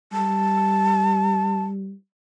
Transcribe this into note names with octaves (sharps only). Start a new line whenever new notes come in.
G3 A5